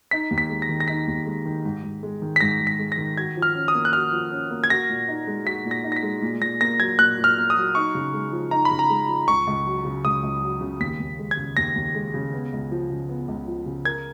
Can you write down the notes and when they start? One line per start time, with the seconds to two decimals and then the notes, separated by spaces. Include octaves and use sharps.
0.11 D#4 B6
0.31 D#2
0.38 B6
0.50 G#3
0.62 A#6
0.69 D#3
0.80 A#6
0.88 D#4 B6
1.07 D#2
1.26 G#3
1.45 D#3
1.65 G#2
1.83 G#2
2.03 G#3
2.22 D#3
2.36 B6
2.41 G#2 A#6
2.60 G#2
2.67 B6
2.79 G#3
2.92 A#6
2.97 D#3
3.17 F#4 G#6
3.37 F3
3.42 F6
3.55 C#4
3.68 D#6
3.74 A#3
3.85 F#6
3.93 F#4 F6
4.13 F3
4.31 C#4
4.50 A#3
4.64 G#6
4.70 F#4 A#6
4.89 A#2
5.08 D#4
5.27 G#3
5.46 F#4 B6
5.65 A#2
5.71 A#6
5.84 D#4
5.92 A#6
5.96 B6
6.03 G#3
6.22 A#2
6.41 A#2 A#6
6.61 A#3 A#6
6.79 F#3 G#6
6.99 A#2 F#6
7.18 A#2
7.24 F6
7.37 A#3
7.50 D#6
7.57 F#3
7.75 D#4 C#6
7.95 C#3
8.14 G#3
8.32 F3
8.51 D#4 A#5
8.65 B5
8.71 C#3
8.79 A#5
8.89 G#3
9.08 F3
9.27 C#2 C#6
9.47 C#2
9.66 F#3
9.85 C#3
10.04 C#2 D#6
10.23 C#2
10.42 F#3
10.61 C#3
10.80 D#2 B6
10.99 D#2
11.19 G#3
11.31 G#6
11.37 C#3
11.57 D#2 A#6
11.76 D#2
11.95 G#3
12.14 C#3
12.33 B3
12.53 C#2
12.71 F3
12.90 C#3
13.09 B3
13.28 C#2
13.47 F3
13.66 C#3
13.85 A#4 G#6